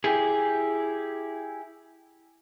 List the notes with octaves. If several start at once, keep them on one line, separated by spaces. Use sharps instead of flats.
E4 G4 G#4